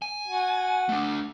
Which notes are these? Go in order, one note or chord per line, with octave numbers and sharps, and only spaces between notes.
G#5
F#4
A3 D4